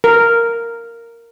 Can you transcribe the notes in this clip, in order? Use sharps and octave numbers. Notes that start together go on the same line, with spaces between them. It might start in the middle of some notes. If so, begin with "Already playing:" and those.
A#4